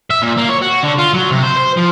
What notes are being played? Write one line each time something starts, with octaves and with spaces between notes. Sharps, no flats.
E5
A#2
A#3
C#5
F#4
D3
F4
F#3
C3
C5
C5
F3